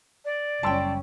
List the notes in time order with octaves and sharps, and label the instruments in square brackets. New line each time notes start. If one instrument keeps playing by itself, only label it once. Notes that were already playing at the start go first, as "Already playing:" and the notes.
[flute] D5
[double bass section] F#1 C#4 [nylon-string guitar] G3 G5 [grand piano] A5 C6 E6